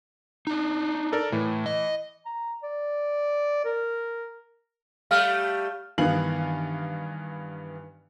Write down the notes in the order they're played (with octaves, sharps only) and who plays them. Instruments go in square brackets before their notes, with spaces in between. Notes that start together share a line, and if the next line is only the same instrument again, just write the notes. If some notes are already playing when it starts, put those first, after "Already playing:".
[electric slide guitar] D4 D#4
[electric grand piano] A4 A#4 D5
[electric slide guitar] A2 [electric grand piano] E3
[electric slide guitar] D#5
[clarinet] A#5
D5
A#4
[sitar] G3 A3 [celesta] F5 F6
[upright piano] G2 D#3 E3 B3 F5 F#7